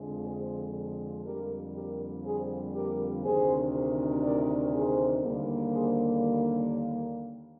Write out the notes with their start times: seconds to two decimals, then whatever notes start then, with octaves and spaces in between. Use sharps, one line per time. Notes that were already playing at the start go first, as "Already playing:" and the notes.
Already playing: F2 D3 F3 G#3
0.24 G#4 C5
1.24 F2 D3 G3 A#3 G4 A#4
1.73 G4 A#4
2.24 G#4 C5
2.74 G4 A#4
3.23 D2 C3 D#3 G#4 C5
4.22 A#4 D5
4.73 G#4 C5
5.22 D#2 D3 G3 A#3
5.72 G#4 C5